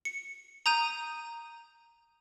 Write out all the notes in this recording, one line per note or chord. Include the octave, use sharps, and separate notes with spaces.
C#7
A#5 D#6 G6 D#7